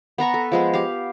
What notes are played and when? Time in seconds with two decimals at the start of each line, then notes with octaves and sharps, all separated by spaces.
0.18 B3 B4 A#5 C#6
0.34 A4
0.52 F3 G#3 B3
0.73 G4 F5